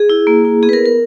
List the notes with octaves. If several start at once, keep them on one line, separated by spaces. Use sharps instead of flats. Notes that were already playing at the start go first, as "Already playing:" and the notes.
Already playing: G#4
E4
A#3
E4
B3 G#4
B4
A#4
B3
A#4